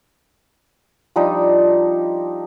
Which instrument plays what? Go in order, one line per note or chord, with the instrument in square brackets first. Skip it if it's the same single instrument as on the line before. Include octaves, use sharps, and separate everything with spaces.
[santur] F3 G3 D4 D#4